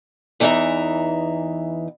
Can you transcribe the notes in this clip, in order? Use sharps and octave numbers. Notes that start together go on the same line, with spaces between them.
E2 E3 D#4 F#4 E5 A#5